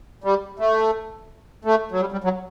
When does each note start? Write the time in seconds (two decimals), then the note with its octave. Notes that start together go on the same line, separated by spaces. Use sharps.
0.24 G3
0.59 A3
1.65 A3
1.91 F#3
2.01 G3
2.12 G3
2.24 F#3